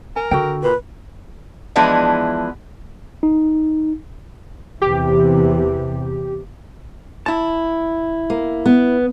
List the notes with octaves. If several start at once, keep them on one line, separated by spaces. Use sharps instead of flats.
A#4 G#5
D3 F#4 A4 G5
A#2 B4
E3 F3 G#3 B3 D4 E4
D#4
E2 C3 E3 G4
E4 A5
A#3
B3